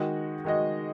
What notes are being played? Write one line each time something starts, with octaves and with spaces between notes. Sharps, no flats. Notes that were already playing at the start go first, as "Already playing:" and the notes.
Already playing: D#3 G#3 F#4 D#5
D#3 G#3 F#4 D#5